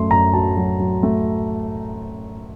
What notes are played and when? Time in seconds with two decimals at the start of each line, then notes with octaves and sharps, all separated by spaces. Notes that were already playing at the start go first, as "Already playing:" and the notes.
Already playing: F#2 A3 C6
0.10 F#2 A#5
0.34 F#3 A5
0.57 F#3
0.80 F#3
1.03 A3